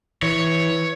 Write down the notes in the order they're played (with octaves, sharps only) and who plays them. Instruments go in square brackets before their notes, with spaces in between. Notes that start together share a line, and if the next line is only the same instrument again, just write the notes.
[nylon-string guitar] E3 [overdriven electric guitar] C#5